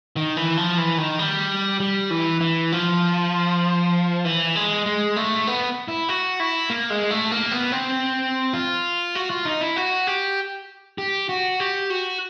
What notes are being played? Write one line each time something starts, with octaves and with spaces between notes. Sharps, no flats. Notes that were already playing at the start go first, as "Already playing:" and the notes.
D#3
E3
F3
E3
D#3
G3
G3
E3
E3
F3
E3
G#3
G#3
A3
B3
E4
F#4
E4
A#3
G#3
A3
A#3
B3
C4
F4
F#4
F4
D#4
E4
F#4
G4
G4
F#4
G4
F#4